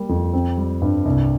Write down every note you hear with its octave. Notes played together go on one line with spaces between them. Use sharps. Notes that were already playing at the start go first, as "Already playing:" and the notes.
Already playing: G3 A#3
F2
C4
G3
G2
C2